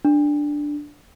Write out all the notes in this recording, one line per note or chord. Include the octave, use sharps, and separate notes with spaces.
D4